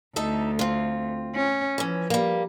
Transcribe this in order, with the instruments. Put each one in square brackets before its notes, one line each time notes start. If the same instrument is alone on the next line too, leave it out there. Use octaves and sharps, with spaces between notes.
[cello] D2 [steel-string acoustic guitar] D#4 A4 E5
[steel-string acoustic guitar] C4 F4
[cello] C#4
[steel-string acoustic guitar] E3 C#4 [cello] F3
[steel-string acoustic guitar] G3 A#3